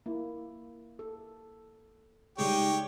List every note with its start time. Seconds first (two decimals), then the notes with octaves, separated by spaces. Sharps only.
0.06 A#3 E4
0.99 A4
2.38 C#3 G3 G#3 D#4 G4 C#5 G5